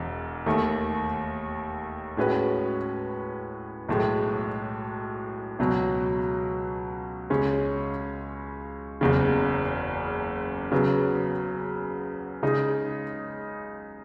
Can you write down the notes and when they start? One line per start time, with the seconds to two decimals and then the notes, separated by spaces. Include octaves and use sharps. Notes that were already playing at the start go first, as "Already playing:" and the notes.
Already playing: E1 E2
0.46 D#2 D#3 A3
2.17 A2 G#3 C#4 F#4 B4
3.89 B1 A2 G#3
5.59 C#2 B2 F#3
7.30 C#2 C#3 G#3 C#4
9.01 F#1 E2 C#3
10.72 C#3 F#3 B3
12.43 C#3 G#3 D#4 G#4